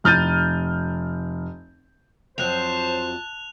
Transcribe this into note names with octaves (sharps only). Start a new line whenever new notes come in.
F1 F6 G6 A6 D#7
F2 F#3 C5 A5 F#6 F7